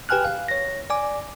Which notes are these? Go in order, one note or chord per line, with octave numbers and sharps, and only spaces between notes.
G4 B4 G5 G#5 F6 F#6
F5
C#5 A#6
D5 G#5 D6